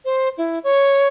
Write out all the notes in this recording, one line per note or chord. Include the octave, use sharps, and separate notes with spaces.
C5
E4
C#5